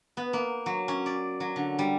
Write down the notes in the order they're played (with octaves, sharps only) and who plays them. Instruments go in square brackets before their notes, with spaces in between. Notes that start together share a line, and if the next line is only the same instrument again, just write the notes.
[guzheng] B3
A#3
F#3
C#4
D5
F#3
D3
G3